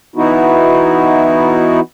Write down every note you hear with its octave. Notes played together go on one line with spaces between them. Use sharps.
E3 B3 D#4 E4 F#4